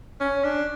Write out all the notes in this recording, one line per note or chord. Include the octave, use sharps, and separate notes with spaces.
C#4
D4